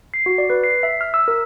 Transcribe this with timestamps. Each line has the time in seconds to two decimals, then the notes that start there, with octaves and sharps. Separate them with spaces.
0.14 C7
0.26 F#4
0.38 D5
0.50 B4
0.64 C7
0.83 E5
1.01 F6
1.14 E6
1.28 A#4